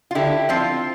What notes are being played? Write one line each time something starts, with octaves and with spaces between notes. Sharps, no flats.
F4
D3 E4 G4
F3 C4 F4